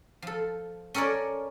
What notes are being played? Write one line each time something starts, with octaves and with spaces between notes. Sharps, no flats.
F3 A4
C#4 A4 A#4 C#5 D5